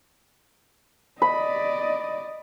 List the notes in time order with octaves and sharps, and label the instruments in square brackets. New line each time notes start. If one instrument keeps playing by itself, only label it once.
[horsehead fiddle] D5 D#5 [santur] B5